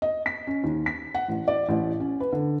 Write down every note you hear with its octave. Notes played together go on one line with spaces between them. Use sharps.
D#5
B6
C#4
D#2
B6
F#5
A1
D5
A1
C#4
B4
D3